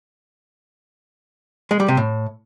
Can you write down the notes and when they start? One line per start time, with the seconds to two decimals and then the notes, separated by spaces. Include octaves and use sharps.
1.71 G#3
1.80 G3
1.88 C3
1.97 A2